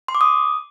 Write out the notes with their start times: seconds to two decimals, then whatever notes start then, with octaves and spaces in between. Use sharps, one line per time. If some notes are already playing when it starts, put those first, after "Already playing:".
0.08 C6
0.15 D6
0.21 D#6